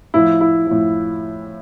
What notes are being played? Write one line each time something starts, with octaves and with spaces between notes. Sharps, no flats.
A2 F3 E4
E4
A2 F3